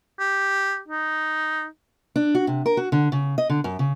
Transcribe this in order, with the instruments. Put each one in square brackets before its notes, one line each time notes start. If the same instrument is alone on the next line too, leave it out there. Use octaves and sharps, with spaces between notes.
[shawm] G4
D#4
[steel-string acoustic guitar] D4
F#4
C3
A#4
F#4
D3
C#3
D#5
D3
F#2
C#3